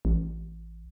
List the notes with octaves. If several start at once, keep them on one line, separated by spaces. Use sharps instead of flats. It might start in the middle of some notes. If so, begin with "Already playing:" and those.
A1